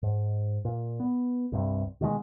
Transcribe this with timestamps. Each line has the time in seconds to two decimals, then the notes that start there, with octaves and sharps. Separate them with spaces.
0.03 G#2
0.65 A#2
1.00 B3
1.52 C2 G2 C3
2.01 B2 D#3 F3 G#3